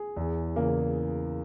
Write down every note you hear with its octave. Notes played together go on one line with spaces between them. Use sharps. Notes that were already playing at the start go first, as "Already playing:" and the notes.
Already playing: G#4
E2
C#3 E3 A#3